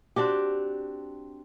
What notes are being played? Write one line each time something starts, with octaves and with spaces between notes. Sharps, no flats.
C4 D4 F#4 G4